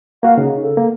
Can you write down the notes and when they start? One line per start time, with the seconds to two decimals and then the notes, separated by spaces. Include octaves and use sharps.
0.23 A#3 F#4 F5
0.38 C#3 D#4
0.62 A4
0.77 A#3